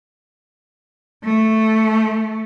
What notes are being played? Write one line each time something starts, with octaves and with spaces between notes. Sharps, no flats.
A3